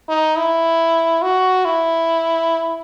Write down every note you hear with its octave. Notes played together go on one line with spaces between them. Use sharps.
D#4
E4
F#4
E4